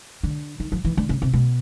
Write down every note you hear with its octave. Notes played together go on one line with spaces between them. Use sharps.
D3
D#3
F3
E3
D3
C#3
C3
B2